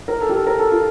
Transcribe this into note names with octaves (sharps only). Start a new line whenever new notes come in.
A#4
A4
G4
A4
A#4
A4
F4